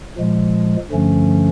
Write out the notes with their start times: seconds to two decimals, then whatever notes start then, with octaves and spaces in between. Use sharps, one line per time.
0.17 A#2 F3 G#3
0.91 G2 D3 F3 A3 C#4